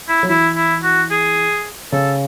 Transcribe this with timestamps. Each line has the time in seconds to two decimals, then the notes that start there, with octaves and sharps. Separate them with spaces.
0.09 E4
0.23 F#3
0.29 E3 E4
0.56 E4
0.83 F#4
1.11 G#4
1.92 C#3 A4